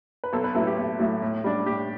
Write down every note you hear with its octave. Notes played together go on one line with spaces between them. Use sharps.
B4
B1 A4
B4
A2 F#3 A3 E4 A4
G4
B1
A2 F#3 A3 E4
A2
G3 D4
A2 G4